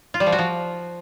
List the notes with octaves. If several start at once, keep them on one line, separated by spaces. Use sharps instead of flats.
F4
G3
F3
F#4
F3